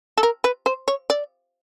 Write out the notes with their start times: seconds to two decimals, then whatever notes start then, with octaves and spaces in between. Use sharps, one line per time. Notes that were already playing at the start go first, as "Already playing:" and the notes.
0.18 A4
0.23 A#4
0.44 B4
0.66 C5
0.88 C#5
1.10 D5